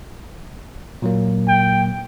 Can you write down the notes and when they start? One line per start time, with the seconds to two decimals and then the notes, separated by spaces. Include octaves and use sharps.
1.02 A#2 F#3 A#3
1.48 G5